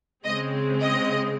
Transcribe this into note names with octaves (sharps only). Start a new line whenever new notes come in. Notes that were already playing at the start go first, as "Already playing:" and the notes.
C#3 G#3 C4 D#5
D#5